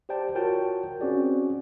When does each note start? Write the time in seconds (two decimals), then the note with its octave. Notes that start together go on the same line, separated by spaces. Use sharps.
0.09 G4 C5 D5 G5 A5
0.35 F4 F#4 A#4 C#5 G5 A5
1.01 C4 C#4 F#4 G#4 D5